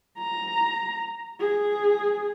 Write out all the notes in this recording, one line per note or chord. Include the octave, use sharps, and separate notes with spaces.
A#5
G#4